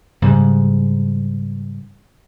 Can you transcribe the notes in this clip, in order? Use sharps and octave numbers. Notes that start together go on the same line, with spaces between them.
G#2 C#3 G3